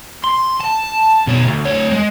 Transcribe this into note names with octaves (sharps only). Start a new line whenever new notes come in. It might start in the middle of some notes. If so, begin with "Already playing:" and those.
C6
A5
B2 C#5
D2
D2 C#5
G#3